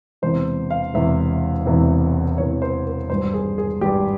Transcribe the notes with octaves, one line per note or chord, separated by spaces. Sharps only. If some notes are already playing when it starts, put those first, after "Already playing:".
E1 E2 C3 E3 C5
F5
E1 E2 C3 E3 E5
E1 E2 C3 E3
E1 E2 C3 E3 C#5
C5
A#4
G#1 G2 G3 C5
G#4
G#4
G#1 G2 G3 G4